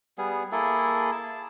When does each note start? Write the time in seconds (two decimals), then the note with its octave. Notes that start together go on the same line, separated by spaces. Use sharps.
0.18 G3 B3 G#4
0.52 A#3 E4 G#4 A4
1.12 A5